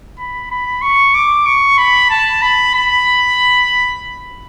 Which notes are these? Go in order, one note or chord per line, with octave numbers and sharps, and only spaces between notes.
B5
B5
C#6
D6
C#6
B5
A5
B5
B5